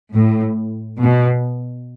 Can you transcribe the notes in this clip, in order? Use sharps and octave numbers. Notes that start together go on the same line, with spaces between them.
A2
B2